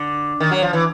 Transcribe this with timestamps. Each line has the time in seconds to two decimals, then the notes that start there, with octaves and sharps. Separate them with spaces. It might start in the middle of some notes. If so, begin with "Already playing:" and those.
Already playing: D3
0.40 D#3
0.51 F#3
0.62 F3
0.73 E3